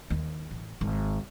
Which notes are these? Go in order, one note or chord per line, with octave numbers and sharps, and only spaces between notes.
D#2
A1
G#1